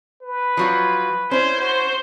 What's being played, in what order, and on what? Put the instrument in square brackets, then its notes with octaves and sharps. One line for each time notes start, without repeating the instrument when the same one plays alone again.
[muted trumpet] B4
[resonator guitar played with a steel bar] F3 F#3 F4
[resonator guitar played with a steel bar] C#4 E4 [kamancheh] C5
[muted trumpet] F#4 [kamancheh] C5